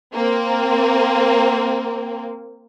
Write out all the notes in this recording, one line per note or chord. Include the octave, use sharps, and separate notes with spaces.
A#3 C4